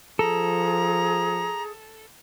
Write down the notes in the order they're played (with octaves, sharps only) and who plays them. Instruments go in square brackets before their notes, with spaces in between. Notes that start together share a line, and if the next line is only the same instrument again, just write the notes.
[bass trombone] F3 [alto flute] G#4 [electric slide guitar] A4 [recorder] A#5